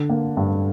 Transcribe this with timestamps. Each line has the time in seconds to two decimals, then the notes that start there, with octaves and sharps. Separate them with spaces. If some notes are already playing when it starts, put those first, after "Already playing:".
Already playing: D3
0.10 A#3
0.37 G2